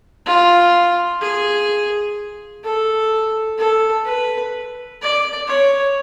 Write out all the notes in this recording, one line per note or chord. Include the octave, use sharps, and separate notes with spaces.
F4
G#4
A4
A4
B4
D5
C#5